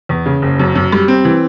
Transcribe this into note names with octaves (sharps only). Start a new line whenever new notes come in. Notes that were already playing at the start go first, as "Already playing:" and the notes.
E2
C#3
F#1
F#2
F#2
G3
C4
E3